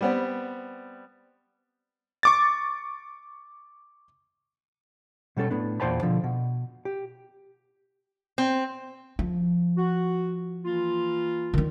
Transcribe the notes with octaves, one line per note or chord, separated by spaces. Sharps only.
G3 B3 C4
C#6 D6 A6
B2 G3 C#4 A4
A2 B3 D4
E2 A#2 C5 G5 A5 B5
B2 D3 F3
B2
G4
C4
F3
F#4
E3 A#3 F4
D#3 D4